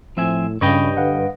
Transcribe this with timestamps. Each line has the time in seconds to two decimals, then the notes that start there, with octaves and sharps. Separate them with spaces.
0.17 A2 F3 C4 E5 G#5
0.61 G2 C#3 G#4 C#5 D#5 G5 B5 C#6
0.97 D3 B4 F5 F#5